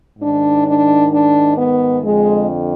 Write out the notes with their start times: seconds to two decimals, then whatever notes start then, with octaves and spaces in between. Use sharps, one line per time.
0.19 G#2 D#3 D4
0.65 D4
1.12 D4
1.57 B3
2.03 F2 D3 G#3